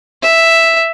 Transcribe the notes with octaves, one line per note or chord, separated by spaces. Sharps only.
E5